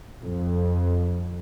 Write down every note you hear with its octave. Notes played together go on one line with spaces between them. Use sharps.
F2